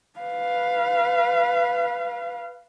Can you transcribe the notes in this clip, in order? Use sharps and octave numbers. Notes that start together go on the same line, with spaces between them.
B4 F5